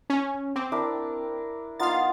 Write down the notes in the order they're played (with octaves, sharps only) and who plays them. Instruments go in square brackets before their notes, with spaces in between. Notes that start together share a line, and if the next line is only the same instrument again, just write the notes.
[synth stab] C#4
[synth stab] C4 [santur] D6
[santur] D4 E4 A#4
[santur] B3 D#4 F4 [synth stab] F5 A6